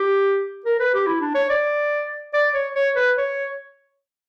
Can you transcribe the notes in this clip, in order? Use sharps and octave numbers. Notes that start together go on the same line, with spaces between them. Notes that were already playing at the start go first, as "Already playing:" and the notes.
Already playing: G4
A#4
B4
G4
E4
D4
C#5
D5
D5
C#5
C#5
B4
C#5